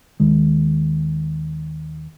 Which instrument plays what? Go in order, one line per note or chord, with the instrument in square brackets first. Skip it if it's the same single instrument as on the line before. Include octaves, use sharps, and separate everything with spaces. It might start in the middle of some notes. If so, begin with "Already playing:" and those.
[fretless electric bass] D#2 D#3 G#3